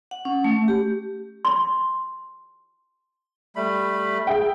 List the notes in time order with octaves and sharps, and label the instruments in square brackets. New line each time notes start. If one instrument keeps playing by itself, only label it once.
[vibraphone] F#5
C#4
A3
G4
[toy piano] C6
[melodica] G3 A3 B5
[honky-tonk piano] G#4 E5 G5